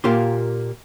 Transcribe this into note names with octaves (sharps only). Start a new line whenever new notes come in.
A#2 A#3 F4 G4 C6